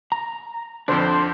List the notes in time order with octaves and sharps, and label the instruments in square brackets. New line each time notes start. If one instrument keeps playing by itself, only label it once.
[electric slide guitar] A#5
[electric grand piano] F2 D3 [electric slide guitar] D4 [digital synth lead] C5